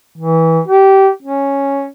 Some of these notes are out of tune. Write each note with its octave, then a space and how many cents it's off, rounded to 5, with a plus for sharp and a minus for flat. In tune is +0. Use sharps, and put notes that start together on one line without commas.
E3 -20
G4 -20
C#4 +0